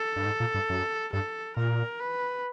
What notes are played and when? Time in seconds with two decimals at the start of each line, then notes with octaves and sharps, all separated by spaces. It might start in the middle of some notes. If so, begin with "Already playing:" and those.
Already playing: A4
0.16 G2
0.26 G#2
0.40 A#2
0.54 G2
0.70 F#2
1.13 G2 A4
1.57 A#2 A#4
2.00 B4